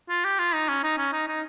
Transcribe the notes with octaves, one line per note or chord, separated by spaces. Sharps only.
F4
G4
F4
D#4
C#4
D#4
C#4
D#4
D#4